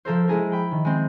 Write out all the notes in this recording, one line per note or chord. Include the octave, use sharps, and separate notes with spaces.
F3 A4 A#4 C5
G#3 E4 G#4 A#4
G5 B5
D#3
G#3 C4